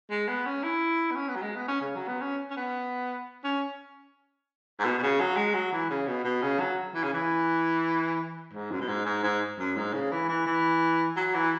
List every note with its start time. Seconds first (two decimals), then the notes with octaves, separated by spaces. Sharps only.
0.10 G#3
0.28 B3
0.46 C#4
0.63 E4
1.11 B3
1.15 C#4
1.29 B3
1.36 F#3
1.42 G#3
1.56 B3
1.68 C#4
1.81 C#3
1.95 F#3
2.07 B3
2.21 C#4
2.50 C#4
2.57 B3
3.44 C#4
4.79 G#2
4.84 B2
4.98 B2
5.02 C#3
5.20 F#3
5.37 G#3
5.54 F#3
5.72 E3
5.90 C#3
6.07 B2
6.25 B2
6.42 C#3
6.60 F#3
6.95 E3
7.03 C#3
7.13 E3
8.53 G#2
8.71 F#2
8.80 B2
8.88 G#2
9.06 G#2
9.23 G#2
9.59 F#2
9.77 G#2
9.93 C#3
10.12 E3
10.29 E3
10.46 E3
11.16 F#3
11.34 E3